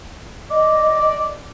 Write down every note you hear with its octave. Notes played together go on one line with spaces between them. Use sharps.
D5 D#5